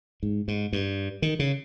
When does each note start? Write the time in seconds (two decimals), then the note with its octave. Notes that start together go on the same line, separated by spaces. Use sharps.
0.23 G#2
0.48 G#2
0.73 G2
1.22 D#3
1.39 C#3